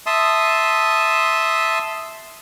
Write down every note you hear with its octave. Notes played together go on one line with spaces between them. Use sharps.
E5 A5 C6 D#6